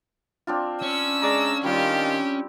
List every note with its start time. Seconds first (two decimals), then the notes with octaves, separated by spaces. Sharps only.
0.47 C4 D4 F4
0.82 C#4 E6
1.22 G#3 D5 A#5
1.64 D#3 G3 C4 F4 G4